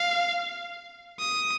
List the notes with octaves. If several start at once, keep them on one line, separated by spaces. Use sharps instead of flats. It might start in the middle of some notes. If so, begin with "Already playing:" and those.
Already playing: F5
D#6